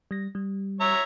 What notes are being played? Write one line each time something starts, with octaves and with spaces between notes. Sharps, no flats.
G3 A#6
G3
C#5 E5 A#5